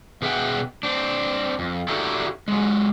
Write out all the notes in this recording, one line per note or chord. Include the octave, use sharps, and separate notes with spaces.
B2 G#4 E5 F#5 G5
C4 D4
F2
D4 E4 F#4 G4 A4 A#4
F#3 G#3